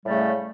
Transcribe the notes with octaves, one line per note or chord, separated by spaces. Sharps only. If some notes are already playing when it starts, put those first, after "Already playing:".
A2 C#3 G3 A3